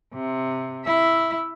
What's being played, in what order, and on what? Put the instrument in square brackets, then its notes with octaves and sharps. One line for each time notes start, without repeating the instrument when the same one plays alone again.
[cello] C3
E4 E5